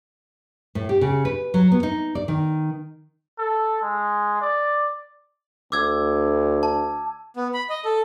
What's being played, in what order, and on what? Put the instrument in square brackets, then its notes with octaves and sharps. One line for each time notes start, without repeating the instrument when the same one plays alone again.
[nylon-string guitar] A2
G4
C#3
B4
F#3
B3
D#4
D5
D#3
[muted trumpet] A4
G#3
D5
[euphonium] D2 [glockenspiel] D6 E6 G#6
[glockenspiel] A5
[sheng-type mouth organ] B3
B5
D#5
A4